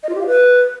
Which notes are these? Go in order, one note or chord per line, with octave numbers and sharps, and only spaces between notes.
D#5
F4
G4
F5
B4